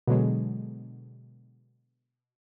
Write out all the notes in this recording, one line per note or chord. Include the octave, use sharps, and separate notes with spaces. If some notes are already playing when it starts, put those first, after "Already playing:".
B2 D3 F#3 G#3